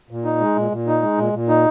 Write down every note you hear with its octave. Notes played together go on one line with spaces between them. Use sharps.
A#2
D#4
G#3
A#2
A#2
D#4
G#3
A#2
A#2
D#4